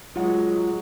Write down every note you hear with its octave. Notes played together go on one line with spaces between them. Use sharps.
F#3 G#3 F4 F#5